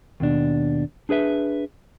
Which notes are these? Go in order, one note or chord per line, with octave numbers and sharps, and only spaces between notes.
D#2 B2 D4
D4 G#4 B4 E5